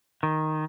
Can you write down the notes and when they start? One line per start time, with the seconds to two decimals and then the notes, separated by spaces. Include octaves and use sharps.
0.23 D#3